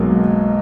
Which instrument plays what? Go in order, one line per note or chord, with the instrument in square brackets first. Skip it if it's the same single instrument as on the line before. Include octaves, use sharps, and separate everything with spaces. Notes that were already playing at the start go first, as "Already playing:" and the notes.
Already playing: [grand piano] B1 B2 G#3 [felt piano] F#3 A#3